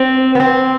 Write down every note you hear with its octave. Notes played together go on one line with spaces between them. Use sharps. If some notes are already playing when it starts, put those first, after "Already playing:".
Already playing: C4
B3
C4